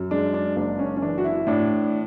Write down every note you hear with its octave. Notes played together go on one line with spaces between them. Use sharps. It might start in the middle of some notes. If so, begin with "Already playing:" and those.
Already playing: F#2
G#3 D4
D4
F#1 D4
C#4
C#4
E3 D4
F#4
E4
A2 D4